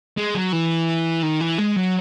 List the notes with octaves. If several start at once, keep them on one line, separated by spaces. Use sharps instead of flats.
G#3
F#3
E3
D#3
E3
G#3
F#3